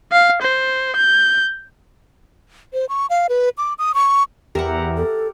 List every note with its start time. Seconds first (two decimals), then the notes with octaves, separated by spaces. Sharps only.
0.12 F5
0.42 C5
0.96 G6
2.74 C5
2.89 C#6
3.10 F5
3.29 B4
3.58 D6
3.79 D#6
3.94 C#6
4.55 E2 G4 A#4 E5 F#5
4.97 A4